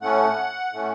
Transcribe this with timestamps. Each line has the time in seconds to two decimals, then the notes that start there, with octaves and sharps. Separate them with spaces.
0.01 A2 A3 C#4 F#5
0.73 A2 A3 C#4